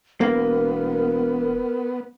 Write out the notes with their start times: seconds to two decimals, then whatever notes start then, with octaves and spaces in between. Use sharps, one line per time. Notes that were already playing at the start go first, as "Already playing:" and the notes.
0.21 E1 A#3 B3 A#4